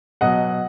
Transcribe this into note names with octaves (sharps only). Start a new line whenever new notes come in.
B2 F#3 D#5 F#5